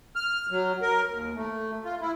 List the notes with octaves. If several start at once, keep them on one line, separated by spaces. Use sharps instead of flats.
F6
F#3
A#4
D#2
A3
F4
E4